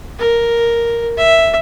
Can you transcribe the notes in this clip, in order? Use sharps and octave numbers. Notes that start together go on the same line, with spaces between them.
A#4
E5